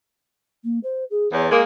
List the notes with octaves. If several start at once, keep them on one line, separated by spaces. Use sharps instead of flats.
A#3
C5
G#4
E2 C#5
G#3 A#3 A#4